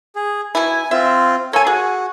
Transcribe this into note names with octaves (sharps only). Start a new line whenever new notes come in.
G#4
B2 E4 G#5
C4 F4 E5
A#3 A4 C#5 G#5
F#4 G#4